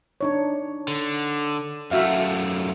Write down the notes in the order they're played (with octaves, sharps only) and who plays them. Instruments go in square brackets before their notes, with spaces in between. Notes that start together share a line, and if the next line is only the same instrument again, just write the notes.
[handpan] D4 D#4 C#5
[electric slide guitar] D3
[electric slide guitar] F#2 A3 [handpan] F#4 E5 F5